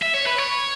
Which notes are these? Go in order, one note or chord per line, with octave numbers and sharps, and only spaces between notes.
E5
C#5
B4
C#5